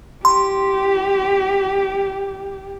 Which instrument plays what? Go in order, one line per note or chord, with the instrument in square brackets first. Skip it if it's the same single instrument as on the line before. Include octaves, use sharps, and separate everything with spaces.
[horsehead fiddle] G4 [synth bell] C6